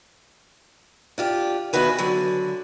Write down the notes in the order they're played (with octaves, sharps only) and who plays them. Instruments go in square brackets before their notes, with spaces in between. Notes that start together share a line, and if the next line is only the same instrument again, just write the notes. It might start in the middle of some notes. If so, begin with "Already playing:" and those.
[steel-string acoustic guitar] D4 F4 G4
E2 D#3 F#4 B4 G#5
D3 F#3